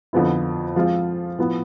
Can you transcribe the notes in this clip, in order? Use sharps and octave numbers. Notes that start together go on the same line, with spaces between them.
F2 D3 F3 B3 E4
F3 G#3 C4 F4
A2 F3 B3